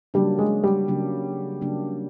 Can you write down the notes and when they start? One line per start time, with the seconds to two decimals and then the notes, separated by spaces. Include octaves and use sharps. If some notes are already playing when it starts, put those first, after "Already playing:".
0.14 C#3 F#3 G3 A#3 D4
0.38 G#3
0.64 G3
0.88 C#3 F#3 A#3 D4
1.61 C#3 F#3 A#3 D4